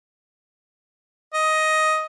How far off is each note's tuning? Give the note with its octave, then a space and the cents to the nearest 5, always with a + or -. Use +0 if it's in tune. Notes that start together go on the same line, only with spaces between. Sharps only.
D#5 +10